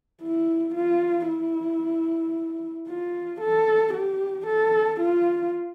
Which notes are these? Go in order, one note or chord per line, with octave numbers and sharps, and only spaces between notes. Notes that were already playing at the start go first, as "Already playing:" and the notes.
E4
F4
E4
F4
A4
G4
A4
F4